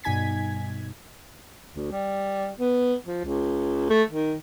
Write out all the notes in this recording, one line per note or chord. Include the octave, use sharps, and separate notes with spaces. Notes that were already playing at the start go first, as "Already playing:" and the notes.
G2 B2 D#4 G#5 G#6 B6
D2
G3
B3
F3
C#2
A3
D#3